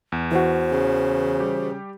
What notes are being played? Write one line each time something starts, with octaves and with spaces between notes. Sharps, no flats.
E2
E3 F#4 C5
C#3
G3 G4